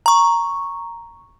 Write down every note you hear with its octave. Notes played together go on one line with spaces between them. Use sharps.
A#5 C#6